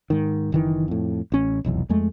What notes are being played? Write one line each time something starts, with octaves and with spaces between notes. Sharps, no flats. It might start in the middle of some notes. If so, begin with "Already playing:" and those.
G#2 D#3
F#1 D#3 E3
F2 A2
A1 C#4
F1 B1 E2
F2 G#3 A3